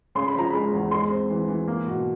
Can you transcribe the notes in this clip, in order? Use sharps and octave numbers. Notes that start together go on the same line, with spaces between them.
C#3 C6
B5
F3 A#5
G#3 B5
E2
G#3 C6
C4
E3
E3
A#3
B2